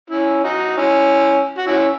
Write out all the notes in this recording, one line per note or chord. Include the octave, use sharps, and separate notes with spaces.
C#4 E4
D#4 F#4
C#4 E4
F#4
C#4 E4